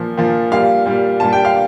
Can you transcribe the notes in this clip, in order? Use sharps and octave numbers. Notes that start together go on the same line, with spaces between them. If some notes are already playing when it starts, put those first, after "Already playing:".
Already playing: A#2 F3
A#2 F3
A#2 G3 F5
A#2 G3
A#2 G3 A5
G5
F5